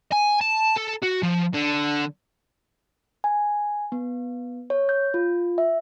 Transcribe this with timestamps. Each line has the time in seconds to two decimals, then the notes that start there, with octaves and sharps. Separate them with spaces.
0.12 G#5
0.41 A5
0.76 A4
1.02 F#4
1.23 F3
1.54 D3
3.24 G#5
3.92 B3
4.70 C#5
4.89 G6
5.14 F4
5.58 E5